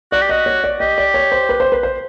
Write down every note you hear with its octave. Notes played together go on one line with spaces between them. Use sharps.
F#4 D5
G4
F#4 D#5
C#5
D5
G4 D#5
D5
C#5
C5
B4
C5
B4
C5